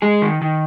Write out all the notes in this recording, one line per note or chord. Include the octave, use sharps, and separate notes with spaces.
G#3 G#4
D#3
D#3